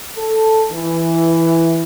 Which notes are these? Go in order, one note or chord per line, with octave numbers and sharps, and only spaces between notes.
A4
E3